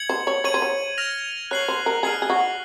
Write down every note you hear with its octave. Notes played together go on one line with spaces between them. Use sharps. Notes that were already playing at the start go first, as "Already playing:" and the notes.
Already playing: G#6 C#7 F#7
C5
C#5
C#5 G#6 D#7 F#7
C5
C#5
F6 A#6 F7
C#5 F#6 C7 F#7
C5
A#4
G#4 F6 C7 F#7
G#4
F#4